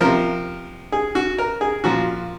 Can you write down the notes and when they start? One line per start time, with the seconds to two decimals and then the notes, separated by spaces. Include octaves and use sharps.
0.01 C3 F3 A#4
0.92 G#4
1.15 F#4
1.38 A#4
1.61 G#4
1.84 A#2 F3 F#4